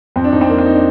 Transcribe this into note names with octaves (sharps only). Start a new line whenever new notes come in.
F2 C4
D4
F2 D#4
C4
F2 A#3
C4
D#4
D4